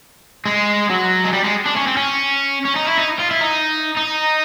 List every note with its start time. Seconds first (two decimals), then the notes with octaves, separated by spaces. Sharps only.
0.46 G#3
0.90 F#3
1.24 G#3
1.33 G3
1.44 G#3
1.66 D4
1.76 C#4
1.87 C4
1.97 C#4
2.65 C#4
2.76 D#4
2.87 E4
2.98 D#4
3.19 F4
3.31 E4
3.41 D#4
3.96 D#4